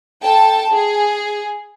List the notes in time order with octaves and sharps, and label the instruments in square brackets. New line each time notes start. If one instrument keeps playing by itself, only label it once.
[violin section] A4 G5 A5
G#4